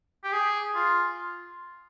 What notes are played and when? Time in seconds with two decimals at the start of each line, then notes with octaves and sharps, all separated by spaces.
0.24 G4
0.33 G#4
0.75 F4